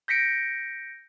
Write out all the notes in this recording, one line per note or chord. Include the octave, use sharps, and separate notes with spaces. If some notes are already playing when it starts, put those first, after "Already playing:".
G6 A#6 B6 C#7 D7